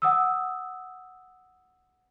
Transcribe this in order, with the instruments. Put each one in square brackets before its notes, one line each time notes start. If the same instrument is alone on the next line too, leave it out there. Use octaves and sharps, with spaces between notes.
[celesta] F#5 D#6 E6